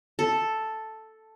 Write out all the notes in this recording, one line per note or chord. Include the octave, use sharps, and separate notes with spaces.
A4